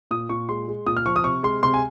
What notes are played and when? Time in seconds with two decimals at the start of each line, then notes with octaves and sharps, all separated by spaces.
0.11 A#2 D#6
0.29 A#2 C#6
0.49 G#3 C6
0.68 G#3
0.86 A#2 D#6
0.97 F6
1.06 F3 C#6
1.16 D#6
1.24 C3 C#6
1.43 G#3 C6
1.63 C3 C6
1.74 G#5